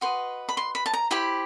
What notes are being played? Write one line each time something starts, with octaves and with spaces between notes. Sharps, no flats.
F#4 B4 D#5 C6
B5
C6
B5
A5
A#5
E4 G4 C5 B5